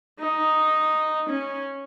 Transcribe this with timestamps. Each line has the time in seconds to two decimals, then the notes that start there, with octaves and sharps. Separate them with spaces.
0.20 D#4
1.29 C#4